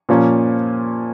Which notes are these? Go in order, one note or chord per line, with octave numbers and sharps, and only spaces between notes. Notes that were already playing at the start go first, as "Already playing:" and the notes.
A#2 F3 A#3 C#4